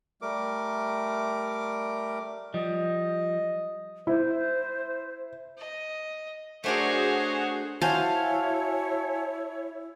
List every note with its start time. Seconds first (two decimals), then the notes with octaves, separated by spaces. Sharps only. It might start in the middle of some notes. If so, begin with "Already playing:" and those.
0.22 G3 A3 A#4 D6
2.54 F3 G3 D#5
4.07 E4 C5
5.58 D#5
6.64 A3 D4 F#4 G#4 A#4 C5 C#5 F#5
7.82 E4 F#4 C5 C#5 F5 G#5 A5